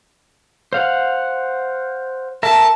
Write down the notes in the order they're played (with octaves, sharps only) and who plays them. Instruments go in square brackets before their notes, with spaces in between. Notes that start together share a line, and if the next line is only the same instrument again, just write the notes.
[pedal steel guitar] C5 F5 F#5
[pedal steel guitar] A#4 E5 [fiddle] A5